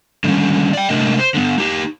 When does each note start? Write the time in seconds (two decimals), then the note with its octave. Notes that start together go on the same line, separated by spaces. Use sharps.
0.24 D3 D#3 G3 G#3 C#4
0.73 D5 G5
0.89 C3 A3 D4 A#4 D#5
1.19 C5
1.34 D3 B3
1.58 D#4 G4